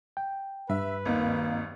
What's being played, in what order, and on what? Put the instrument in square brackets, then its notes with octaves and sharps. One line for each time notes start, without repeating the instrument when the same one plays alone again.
[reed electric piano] G5
[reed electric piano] G2 [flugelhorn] B4 [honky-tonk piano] E5
[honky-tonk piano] G#1 D#2 D#4 [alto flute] A#3